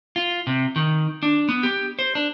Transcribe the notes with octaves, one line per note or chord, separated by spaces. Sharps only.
F4
C3
D#3
D4
B3
G4
C5
D4